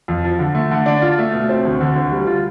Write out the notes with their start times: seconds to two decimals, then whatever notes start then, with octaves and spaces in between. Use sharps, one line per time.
0.08 F2
0.24 F3
0.39 D3
0.55 A3
0.71 D3
0.86 D4
1.02 F4
1.18 A3
1.33 B2
1.49 C4
1.65 D2
1.81 D3
1.96 D2
2.12 G3
2.27 F4